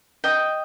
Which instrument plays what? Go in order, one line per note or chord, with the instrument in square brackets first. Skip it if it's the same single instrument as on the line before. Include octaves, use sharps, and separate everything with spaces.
[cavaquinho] D#5 G5